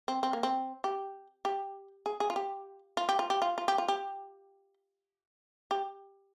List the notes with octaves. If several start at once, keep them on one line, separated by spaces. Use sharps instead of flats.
C4
C4
A#3
C4
G4
G4
G#4
G#4
F4
G4
F4
G4
F4
G4
F4
F4
G4
F4
G4
G4